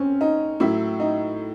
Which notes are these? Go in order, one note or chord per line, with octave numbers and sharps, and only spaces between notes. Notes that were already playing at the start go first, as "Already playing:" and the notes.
Already playing: C4 C#4
D#4
A2 F#3 E4
D#4